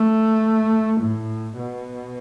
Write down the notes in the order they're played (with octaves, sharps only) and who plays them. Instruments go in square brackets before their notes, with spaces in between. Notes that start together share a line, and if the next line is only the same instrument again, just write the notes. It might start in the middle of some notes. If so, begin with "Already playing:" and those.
Already playing: [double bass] A3
A2
B2